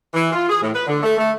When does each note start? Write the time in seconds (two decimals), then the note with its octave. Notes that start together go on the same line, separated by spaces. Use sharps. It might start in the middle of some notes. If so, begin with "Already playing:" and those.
0.14 E3
0.33 F4
0.49 G#4
0.62 A2
0.75 B4
0.87 D3
1.03 A3
1.18 A3